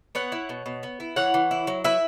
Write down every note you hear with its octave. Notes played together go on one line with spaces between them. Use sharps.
B3 C#5 F#5
E4
B2
B2
B3
E4
E3 C#5 F#5
E3
E4
F#3
E4 B4 E5